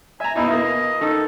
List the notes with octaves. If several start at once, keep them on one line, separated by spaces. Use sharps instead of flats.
E5 G#5 A#5
D#2 B2 D#4 E4
B2 A#3 D#5
D#3 D#4 A4